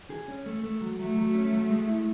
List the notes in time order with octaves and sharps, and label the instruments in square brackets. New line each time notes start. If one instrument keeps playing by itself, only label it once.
[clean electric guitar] G#4
C#4
A3
A3
F#3
[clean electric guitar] F#3 [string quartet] A3
[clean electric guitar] F#3
C#4
F#3
G#3
E4